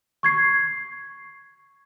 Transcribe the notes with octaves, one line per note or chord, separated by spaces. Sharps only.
C#6 G#6 C7